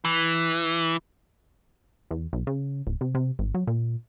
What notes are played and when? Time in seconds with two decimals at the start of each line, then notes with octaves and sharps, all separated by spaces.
0.05 E3
2.11 E2
2.33 B1
2.47 C#3
2.87 D1
3.01 C3
3.15 C3
3.39 G#1
3.54 F#3
3.67 A#2